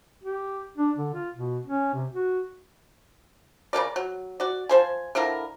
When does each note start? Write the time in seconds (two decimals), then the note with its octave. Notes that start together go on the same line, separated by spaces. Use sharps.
0.24 G4
0.77 D4
0.97 D3
1.14 F4
1.35 B2
1.66 C#4
1.94 C3
2.12 F#4
3.73 C#3 C#4 A#4 D5
3.96 F#3
4.40 F#4 D5
4.69 F3 C5 G#5
5.15 D3 F3 E4 A#4